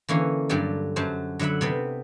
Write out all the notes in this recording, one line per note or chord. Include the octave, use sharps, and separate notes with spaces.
D3 E3 A#3 C#4
G2 D3 F#3 G4 D5
F#2 F#3 C5 A5
D3 F#3 E5 F#5 B5
C3 B3 C4